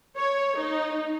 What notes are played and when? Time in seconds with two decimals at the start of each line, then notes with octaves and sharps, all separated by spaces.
0.16 C#5
0.56 D#4